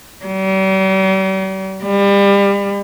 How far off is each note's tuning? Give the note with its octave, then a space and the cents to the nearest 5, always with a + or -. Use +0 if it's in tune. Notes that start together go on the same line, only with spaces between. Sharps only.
G3 -40
G3 +30